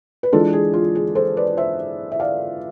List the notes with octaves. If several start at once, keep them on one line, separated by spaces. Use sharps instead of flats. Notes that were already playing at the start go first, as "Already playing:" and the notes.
B4
E3 G#3 D4 F4 A4
G#4
F4
G#4
A4 C5
B4 D5
C5 E5
E5
D5 F5